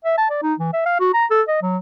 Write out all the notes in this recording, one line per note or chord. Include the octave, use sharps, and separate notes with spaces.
E5
A5
D5
D#4
E3
E5
F5
F#4
A#5
A4
D#5
F#3